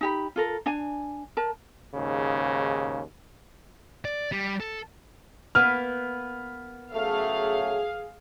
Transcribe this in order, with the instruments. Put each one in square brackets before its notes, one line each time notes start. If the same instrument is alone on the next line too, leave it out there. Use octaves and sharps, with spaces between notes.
[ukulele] D#4 G4 B5
F4 A4 A#4
D4 G#5
A#4 A5
[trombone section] D#2 G#2 C#3
[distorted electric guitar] D5
G3
A4
[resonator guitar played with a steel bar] A#3 B3 B4 [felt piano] F6
[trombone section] C#3 F#3 A3 [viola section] G#4 F5